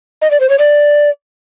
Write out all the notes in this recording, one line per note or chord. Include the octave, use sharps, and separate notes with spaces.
D#5
D5
C5
C#5
D5